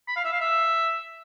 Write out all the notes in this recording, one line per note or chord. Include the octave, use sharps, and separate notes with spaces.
B5
F5
E5
F5
E5